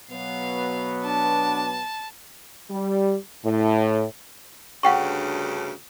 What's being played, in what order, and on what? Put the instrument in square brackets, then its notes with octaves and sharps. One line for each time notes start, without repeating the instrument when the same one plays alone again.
[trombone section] B2 F#3 B3 [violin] F5
[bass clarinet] D4 [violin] A5
[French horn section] G3
A2
[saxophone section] D2 G2 C#3 [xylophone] F#5 G5 C#6